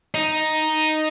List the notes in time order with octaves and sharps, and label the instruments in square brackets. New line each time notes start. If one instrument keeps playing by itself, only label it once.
[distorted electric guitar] D#4